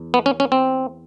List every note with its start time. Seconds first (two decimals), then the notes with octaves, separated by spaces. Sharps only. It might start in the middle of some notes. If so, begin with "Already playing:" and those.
Already playing: E2
0.14 B3
0.26 C#4
0.40 C#4
0.52 C4